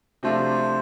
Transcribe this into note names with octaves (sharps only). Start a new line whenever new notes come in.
C3 F3 A3 D4 F4 C5